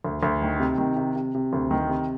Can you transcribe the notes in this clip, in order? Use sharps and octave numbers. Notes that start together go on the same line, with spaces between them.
D2
D2
D#3
C3
D#3
C3
C3
C3
D2
D#3
C3